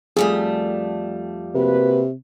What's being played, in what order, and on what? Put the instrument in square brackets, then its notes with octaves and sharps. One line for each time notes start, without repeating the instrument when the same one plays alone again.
[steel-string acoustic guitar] F2 G3 A3 [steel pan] G#4
[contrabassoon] C3 [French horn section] A#3 F#4 B4